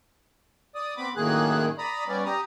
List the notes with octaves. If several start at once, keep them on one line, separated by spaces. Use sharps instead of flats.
D5 D#6
B3 C4 B5 D6
F#2 A2 D#3 A#3 G#4 F#6
D5 A#5 B5 D#6
G3 B3 C#4 D5
G4 A#5 D#6